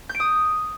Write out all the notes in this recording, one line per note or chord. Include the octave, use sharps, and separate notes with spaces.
G6
D7
D#6